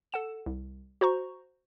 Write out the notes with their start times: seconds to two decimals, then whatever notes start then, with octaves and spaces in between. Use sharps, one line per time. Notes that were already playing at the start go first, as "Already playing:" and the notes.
0.12 A4 F#5 E7
0.46 C2
1.01 F#4 C5 A#5 C#6